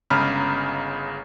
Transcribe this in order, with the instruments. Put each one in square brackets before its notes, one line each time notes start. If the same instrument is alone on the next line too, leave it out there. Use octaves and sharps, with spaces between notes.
[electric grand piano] G1 C#3 G#3 A#5 B5 F6